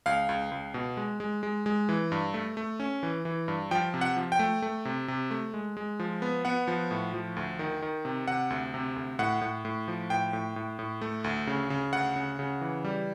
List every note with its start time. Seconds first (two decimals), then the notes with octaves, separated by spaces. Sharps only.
0.06 C#2 F5
0.29 C#2
0.51 C#2
0.74 B2
0.97 G#3
1.20 G#3
1.43 G#3
1.66 G#3
1.89 E3
2.12 G2
2.34 A3
2.57 A3
2.80 C#4
3.03 E3
3.25 E3
3.48 G2
3.71 F3 G5
3.94 C3
4.01 F#5
4.17 F3
4.32 G5
4.39 A3
4.62 A3
4.85 C3
5.08 C3
5.31 A3
5.54 G#3
5.77 G#3
5.99 F3
6.22 B3
6.45 B3 F#5
6.68 F3
6.91 A2
7.14 F3
7.36 D2
7.59 D#3
7.82 D#3
8.05 C3
8.28 C3 F#5
8.50 D2
8.74 C3
8.96 D2
9.19 A2 F#5
9.41 A2
9.65 A2
9.88 F3
10.10 A2 G5
10.33 A2
10.56 A2
10.79 A2
11.01 A3
11.24 D2
11.47 C#3
11.70 C#3
11.93 D2 F#5
12.16 C#3
12.39 C#3
12.61 E3
12.84 G3